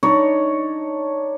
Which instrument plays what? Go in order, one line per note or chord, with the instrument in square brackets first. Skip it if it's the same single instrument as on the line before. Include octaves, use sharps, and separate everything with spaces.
[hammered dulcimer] D4 D#4 C#5